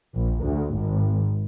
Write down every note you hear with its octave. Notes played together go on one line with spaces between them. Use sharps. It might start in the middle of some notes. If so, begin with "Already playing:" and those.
A#1
D2
G#1